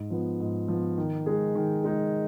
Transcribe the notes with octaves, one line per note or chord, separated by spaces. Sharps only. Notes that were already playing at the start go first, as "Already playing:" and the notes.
Already playing: G#2
F3 B3
G#2
F3 B3
D#3
G#3 D#4 G#4
D#3
G#3 D#4 G#4